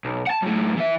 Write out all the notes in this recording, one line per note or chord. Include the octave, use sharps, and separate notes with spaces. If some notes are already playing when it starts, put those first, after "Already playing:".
B1
F#5 A5
F#2 A2
E3 E5